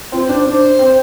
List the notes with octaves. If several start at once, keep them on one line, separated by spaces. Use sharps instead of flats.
C4 F4
C5
D4
C5
D4 C5
C4